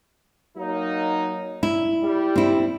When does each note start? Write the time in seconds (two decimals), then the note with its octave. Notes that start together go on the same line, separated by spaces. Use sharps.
0.57 F#3 A#3 D#4
1.63 E4
2.03 G3
2.36 C4 E4